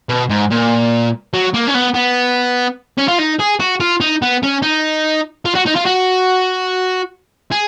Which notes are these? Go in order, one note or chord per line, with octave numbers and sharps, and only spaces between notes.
B2
G#2
A#2
F#3
A#3
C#4
B3
B3
C#4
F4
D#4
G#4
F#4
F4
D#4
B3
C#4
D#4
F4
F#4
D#4
F4
F#4
G#4